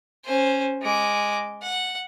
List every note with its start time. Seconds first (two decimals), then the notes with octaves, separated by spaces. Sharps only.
0.25 C#4 C5
0.82 G#3 D6
1.62 F#5